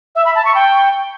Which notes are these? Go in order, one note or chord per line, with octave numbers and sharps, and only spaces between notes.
E5
B5
A5
C#6
G5